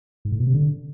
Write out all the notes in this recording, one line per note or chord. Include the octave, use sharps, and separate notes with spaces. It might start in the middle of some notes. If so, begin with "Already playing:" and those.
G#2
A2
B2
C3
D3